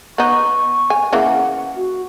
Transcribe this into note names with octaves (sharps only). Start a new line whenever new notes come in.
B3 D#4 C#6
G#5
C#3 E3 A#3 F#5
F#4